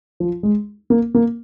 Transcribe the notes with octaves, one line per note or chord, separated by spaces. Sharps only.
F3
G#3
A#3
A#3